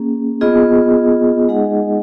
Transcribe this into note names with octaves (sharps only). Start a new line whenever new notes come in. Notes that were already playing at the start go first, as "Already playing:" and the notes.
Already playing: A#3 C#4 G#4
B3 F4 G#4 D#5
G#3 D#4 G#4 D#5 F#5